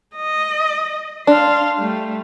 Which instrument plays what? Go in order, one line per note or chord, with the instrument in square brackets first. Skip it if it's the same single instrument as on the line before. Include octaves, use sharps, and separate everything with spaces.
[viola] D#5
[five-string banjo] D4 [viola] F5 C6
[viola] G3 A3